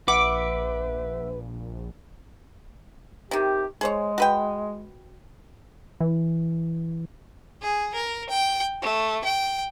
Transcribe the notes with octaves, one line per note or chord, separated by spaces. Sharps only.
A#1 B4 E5 F#5 D6
C3 D#3 G4
G#3 G#4 C5 C#5
F#4 B4 G5
E3
G#4
A#4
G5
A3
G5